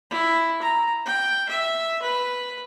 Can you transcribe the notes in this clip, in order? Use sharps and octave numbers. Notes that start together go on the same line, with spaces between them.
E4
A#5
G5
E5
B4